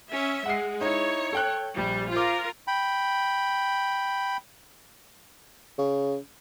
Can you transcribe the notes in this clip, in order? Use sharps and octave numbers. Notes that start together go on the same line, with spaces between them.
C#4 E5
G#3 F#5 C7
D#4 E4 C#5
A4 G5 F#6
A#1 G3
F4 A#4 C5 D6
G5 B5
C#3